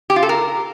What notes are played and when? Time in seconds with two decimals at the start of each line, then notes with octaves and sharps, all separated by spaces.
0.10 G4
0.16 F4
0.23 A4
0.29 A#4